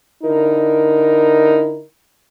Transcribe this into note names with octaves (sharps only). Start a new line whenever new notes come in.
D3 D#4 E4 A#4